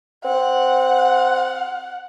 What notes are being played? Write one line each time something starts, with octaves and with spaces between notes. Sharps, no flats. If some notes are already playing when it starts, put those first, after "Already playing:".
C4 F#5